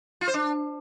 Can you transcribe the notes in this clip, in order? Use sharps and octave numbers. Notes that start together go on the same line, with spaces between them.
F4
C5
D4